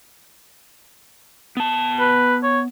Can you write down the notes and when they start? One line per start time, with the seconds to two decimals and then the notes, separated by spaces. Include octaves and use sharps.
1.57 B3 A5
2.00 B4
2.43 C#5